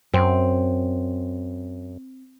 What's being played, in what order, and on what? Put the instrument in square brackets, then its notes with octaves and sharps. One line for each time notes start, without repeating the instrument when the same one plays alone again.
[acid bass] F#2 [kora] C4